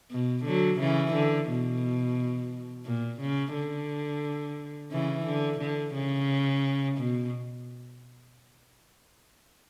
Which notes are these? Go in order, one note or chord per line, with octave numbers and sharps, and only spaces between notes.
B2
D3 F#3
C#3 E3
D3
B2
A#2
C#3
D3
C#3 E3
D3
D3
C#3
B2